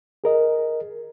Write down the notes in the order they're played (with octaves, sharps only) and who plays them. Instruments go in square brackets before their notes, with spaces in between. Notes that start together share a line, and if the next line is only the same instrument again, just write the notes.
[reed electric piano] G#4 A#4 D#5